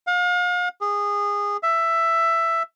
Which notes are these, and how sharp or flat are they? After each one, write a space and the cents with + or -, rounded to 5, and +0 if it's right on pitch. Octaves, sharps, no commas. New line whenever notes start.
F5 +40
G#4 -20
E5 +10